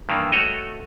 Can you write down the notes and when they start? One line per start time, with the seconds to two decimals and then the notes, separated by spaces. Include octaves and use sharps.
0.09 G2 D#3 E3 A#3
0.32 A3 F#4 C#5 D#5